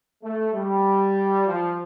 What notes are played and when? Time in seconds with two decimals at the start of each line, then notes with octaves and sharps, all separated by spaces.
0.23 A3
0.54 G3
1.47 F3